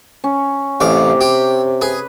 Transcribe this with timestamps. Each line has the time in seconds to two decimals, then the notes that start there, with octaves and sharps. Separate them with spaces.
0.24 C#4
0.80 A1 C3 F5 D6
1.21 G4
1.82 G#4 B4